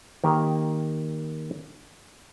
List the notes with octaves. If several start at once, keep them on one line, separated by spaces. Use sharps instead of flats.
D#3 A#3 G4